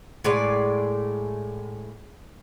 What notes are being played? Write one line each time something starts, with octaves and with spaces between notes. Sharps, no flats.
A2 G#3 D5